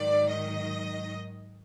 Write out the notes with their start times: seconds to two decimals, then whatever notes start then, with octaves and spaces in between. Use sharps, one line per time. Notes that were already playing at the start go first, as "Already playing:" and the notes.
Already playing: G#2 D#3 F#3 D5
0.30 D#5